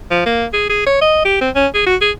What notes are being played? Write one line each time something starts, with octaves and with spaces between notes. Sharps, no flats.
F3
A#3
G#4
G#4
C#5
D#5
G4
C4
C#4
G#4
F#4
G#4